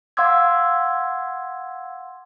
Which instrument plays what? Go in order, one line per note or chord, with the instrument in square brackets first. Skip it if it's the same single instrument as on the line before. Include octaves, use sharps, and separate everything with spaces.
[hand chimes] F5 F#5 C6 D6 E6 G#6